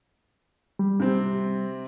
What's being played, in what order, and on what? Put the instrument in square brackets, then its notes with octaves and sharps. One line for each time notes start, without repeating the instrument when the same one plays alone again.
[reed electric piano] G3
[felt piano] C3 C4